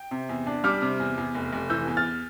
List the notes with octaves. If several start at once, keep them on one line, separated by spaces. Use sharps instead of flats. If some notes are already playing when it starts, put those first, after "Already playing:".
Already playing: G5
C3
E2
D4
G3 D6 F6
C3
E2
E2
F1
F1
E3 E6 G6
E2
F6 A6